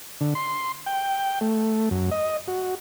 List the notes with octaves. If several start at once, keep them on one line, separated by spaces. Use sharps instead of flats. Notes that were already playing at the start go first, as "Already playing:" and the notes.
D3
C6
G5
A3
F#2
D#5
F#4